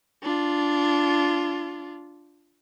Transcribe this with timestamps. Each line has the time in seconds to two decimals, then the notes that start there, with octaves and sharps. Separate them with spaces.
0.23 D4 F4